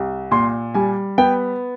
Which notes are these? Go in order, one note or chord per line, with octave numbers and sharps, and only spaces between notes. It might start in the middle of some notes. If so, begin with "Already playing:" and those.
Already playing: C2
A#2 C6
G3 G#5
B3 G5